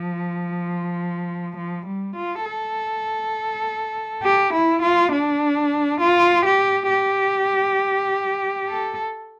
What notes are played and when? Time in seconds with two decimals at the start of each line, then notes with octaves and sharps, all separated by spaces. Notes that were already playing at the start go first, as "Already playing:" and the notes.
Already playing: F3
1.57 F3
1.86 G3
2.16 F4
2.45 A4
4.23 G4
4.53 E4
4.82 F4
5.12 D4
6.01 F4
6.45 G4
6.90 G4
8.68 A4